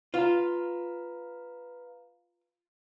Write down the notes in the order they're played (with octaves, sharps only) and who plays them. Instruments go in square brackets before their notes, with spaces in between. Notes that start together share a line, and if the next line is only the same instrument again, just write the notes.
[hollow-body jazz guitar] F4 [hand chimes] B4 F5 A#5